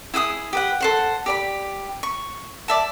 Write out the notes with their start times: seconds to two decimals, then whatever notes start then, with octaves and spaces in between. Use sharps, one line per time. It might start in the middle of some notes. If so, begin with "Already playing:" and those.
0.14 E4 G#4 F#5 D#6
0.53 G4 B4 F#5
0.80 A4 C5 F#5
1.26 G4 D5 B5
2.03 C#6
2.68 D5 E5 A5